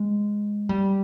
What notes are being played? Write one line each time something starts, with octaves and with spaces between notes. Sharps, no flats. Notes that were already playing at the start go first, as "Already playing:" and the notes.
Already playing: G#3
G3